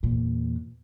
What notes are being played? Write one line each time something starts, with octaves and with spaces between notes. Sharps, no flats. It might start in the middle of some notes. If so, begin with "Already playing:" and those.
E2 A#2